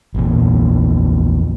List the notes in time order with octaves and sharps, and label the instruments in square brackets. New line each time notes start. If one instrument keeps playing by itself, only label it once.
[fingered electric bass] A#1 E2 A#2